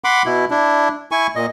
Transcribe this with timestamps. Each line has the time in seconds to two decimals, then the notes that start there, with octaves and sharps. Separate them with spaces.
0.04 F#5 B5 C6 D6
0.26 B2 E4
0.51 D4 E4
1.12 E4 G#5 C#6
1.36 A#2 D#5